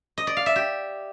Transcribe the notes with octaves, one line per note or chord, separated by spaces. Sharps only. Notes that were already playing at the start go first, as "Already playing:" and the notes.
D#5
D5
F5
E5
G4